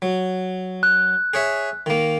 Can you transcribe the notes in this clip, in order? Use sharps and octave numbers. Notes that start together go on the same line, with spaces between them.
F#3
F#6
G#4 C#5 E5
D#3 A#3